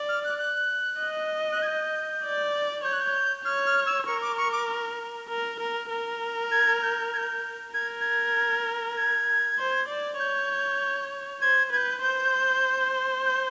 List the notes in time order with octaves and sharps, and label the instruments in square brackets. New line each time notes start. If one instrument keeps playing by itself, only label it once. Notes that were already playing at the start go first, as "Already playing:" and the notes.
Already playing: [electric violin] D5
[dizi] F6
F#6
F#6
[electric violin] D#5
[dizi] F#6
G#6
G6
[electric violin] D5
[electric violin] C#5 [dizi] G6
[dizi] F#6
G6
[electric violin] C#5 [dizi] F6
[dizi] F6
E6
[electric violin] A#4 [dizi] C#6
[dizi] D6
C#6
D6
[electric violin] A#4
A#4
A#4
[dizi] G#6
G6
G#6
G6
[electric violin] A#4 [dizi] G#6
[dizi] G#6
G#6
[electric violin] C5
D5
[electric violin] C#5 [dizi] G6
[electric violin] C5 [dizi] G#6
[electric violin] B4 [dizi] G6 G#6
[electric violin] C5 [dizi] G6
[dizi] G6